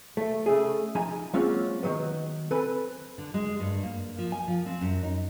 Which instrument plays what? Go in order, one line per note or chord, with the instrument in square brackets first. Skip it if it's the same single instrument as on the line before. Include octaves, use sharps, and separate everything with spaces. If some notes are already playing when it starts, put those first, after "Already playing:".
[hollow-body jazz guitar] A3
C#3 A3 G#4
F3 D#4 G#5 A#5
F#3 G#3 A#3 C4 C#4 F4
D#3 E3 F#3 B3
C4 A4 B4 G#5 B5
[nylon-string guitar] D3
G#3
G2
A#3
F3
G#5
F3
C4
F#2
D#4